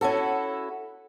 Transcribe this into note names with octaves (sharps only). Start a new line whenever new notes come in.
C#4 E4 F#4 A4